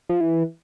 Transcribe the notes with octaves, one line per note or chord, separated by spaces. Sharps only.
F3
E3